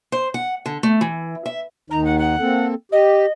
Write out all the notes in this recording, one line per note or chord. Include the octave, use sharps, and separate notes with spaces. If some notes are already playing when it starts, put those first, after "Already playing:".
C5
F#5
D3
A3
E3
E5
D#2 D#3 D#4 A#5
F#5
F#5
A#3 C4 A4
G4 D#5